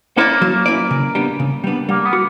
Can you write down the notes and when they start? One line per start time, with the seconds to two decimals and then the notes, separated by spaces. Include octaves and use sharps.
0.16 A#3 C#4 E4 B4 D5
0.42 F#3
0.66 C#4 E4 B4 D5
0.91 C#3
1.15 G3 B3 D4
1.40 C#3
1.64 G3 B3 D4
1.89 G3 A#3
2.05 B3
2.13 F#4